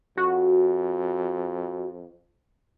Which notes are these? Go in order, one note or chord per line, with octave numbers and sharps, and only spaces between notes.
F2 F#4